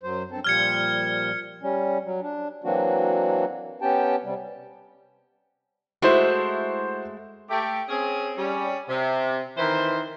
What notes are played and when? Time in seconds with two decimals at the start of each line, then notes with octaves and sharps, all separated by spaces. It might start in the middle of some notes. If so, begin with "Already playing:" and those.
0.03 F#2 F#3 C5
0.31 G2 C4 A4
0.44 A#2 F3 G3 F6 G#6 C#7
1.62 G3 C#4
2.05 F#3
2.22 D4
2.64 E3 F#3 A#3 C4 D4 F#4
3.82 B3 C#4 G4 G5 A5
4.23 C3 G3
6.02 G#3 A3 E4 F#4 C5
7.50 A3 G4
7.89 C4 C#4 G#4
8.36 G3 C#4
8.89 C3
9.58 D#3 E3 C5